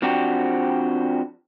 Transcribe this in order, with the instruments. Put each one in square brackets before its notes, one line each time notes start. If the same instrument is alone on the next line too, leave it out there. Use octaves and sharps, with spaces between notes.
[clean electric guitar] F3 C4 D4 F#4 G4